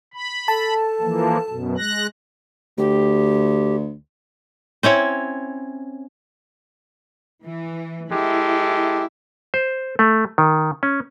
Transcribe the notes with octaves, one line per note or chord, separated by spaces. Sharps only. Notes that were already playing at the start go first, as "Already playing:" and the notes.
B5
A4 A5
E3 F3 A#3
F#2 B2
G#3 F#6 A#6
D2 G4
C4 C#4 E4 C#5
E3
G#3 E4 G4 A4
C5
A3
D#3
C#4